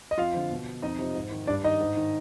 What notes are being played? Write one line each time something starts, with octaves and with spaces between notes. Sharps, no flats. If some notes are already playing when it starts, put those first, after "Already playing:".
D#5
F2 F4 F5
D3 F3
B2
F2 D#4 D#5
C3 F3
G#2
D#3
G2 D4 D5
D#3 D#4 D#5
G#2
D#3